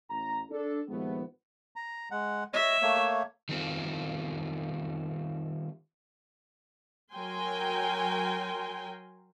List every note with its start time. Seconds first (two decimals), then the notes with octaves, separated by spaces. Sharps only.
0.10 A1 A#5
0.50 D4 A4
0.89 D#2 A#2 F3 G#3 A3 B3
1.76 A#5
2.11 G#3 F#5
2.53 C#5 D#5 E5
2.82 A3 A#3 C#5
3.49 D#3 G3 C4 F4
7.14 F#3 A#4 G5 G#5 C6